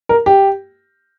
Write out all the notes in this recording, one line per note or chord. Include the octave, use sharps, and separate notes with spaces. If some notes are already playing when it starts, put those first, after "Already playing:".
A#4
G4